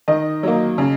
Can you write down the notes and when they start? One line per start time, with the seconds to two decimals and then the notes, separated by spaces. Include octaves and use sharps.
0.08 D#3 D#5
0.43 F#3 A#3
0.78 C#3